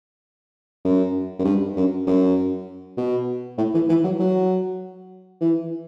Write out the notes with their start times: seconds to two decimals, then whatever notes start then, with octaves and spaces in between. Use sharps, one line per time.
0.85 F#2
1.39 F#2
1.44 G2
1.76 F#2
2.07 F#2
2.97 B2
3.58 A2
3.74 E3
3.89 E3
4.04 F#3
4.19 F#3
5.41 E3